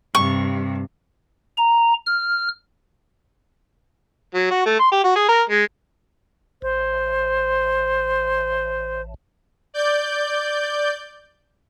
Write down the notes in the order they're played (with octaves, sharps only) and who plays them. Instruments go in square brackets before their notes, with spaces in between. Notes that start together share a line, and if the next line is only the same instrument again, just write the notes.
[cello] G2 C3 [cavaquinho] C#6
[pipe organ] A#5
F6
[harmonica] F#3
F#4
A3
C6
G4
F#4
G#4
A#4
G#3
[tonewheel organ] A1 [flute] C5
[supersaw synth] D5 G6